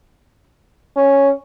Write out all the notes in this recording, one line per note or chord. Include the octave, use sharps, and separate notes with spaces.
C#4